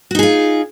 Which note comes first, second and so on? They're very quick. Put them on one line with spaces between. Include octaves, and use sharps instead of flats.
F#4 D#4 G#4 F4